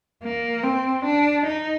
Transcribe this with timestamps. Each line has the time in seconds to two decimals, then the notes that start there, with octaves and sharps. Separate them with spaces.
0.24 A#3
0.64 C4
1.06 D4
1.46 D#4